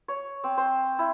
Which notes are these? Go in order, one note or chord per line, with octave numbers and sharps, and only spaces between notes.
C#5
C4
C5
E4